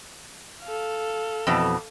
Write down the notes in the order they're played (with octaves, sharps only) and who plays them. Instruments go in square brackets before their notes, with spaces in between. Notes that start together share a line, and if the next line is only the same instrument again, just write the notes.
[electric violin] A4 F5
[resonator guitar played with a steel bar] F2 B2 E3